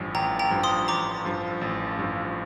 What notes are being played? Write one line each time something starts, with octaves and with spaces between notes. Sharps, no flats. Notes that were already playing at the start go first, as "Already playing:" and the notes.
Already playing: A1 G2 F3
A1 G5 A#5
G5 A#5
G2 F3
C6 D#6
A1 A#5 D6
G2 F3
A1
G2 F3